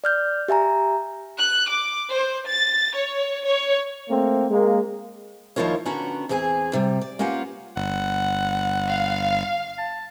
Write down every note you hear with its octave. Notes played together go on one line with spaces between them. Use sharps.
D5 F6 G6
G4 E5 G#5 A#5
F#6
D6
C5
A6
C#5
C#5
A3 A#3 C4
G#3 A#3
D#2 F3 E4 F4 A#4 C#5
D3 B3 C#4 F#4 A#5
E2 C4 G#4 A4 G#5
C3 G3
D5
A#3 B3 C#4 F4 G4 F#5
G1 F#5
F5
A5